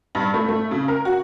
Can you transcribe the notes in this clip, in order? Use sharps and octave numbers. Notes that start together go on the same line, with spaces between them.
G2
A3
A3
C#3
A#4
F#4